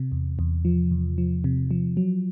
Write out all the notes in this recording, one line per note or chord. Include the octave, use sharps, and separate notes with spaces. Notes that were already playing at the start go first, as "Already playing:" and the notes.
Already playing: C3
E2
E2
F3
E2
F3
C3
F3
F#3